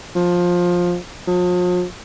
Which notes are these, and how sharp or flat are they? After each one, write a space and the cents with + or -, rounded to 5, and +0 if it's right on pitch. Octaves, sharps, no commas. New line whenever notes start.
F3 +15
F3 +45